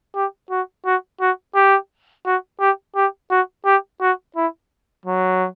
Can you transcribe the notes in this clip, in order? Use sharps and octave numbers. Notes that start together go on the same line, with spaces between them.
G4
F#4
F#4
F#4
G4
F#4
G4
G4
F#4
G4
F#4
E4
F#3